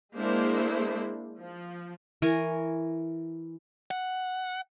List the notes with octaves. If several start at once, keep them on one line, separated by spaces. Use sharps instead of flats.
G#3 A#3 D4 E4 C5
F3
E3 A#4 G#5 C#6
F#5